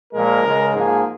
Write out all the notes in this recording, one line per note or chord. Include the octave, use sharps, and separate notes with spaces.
A#2 F3 G#3 A#4
C#2 C#3 G#3
G#2 F3 A#3 G#4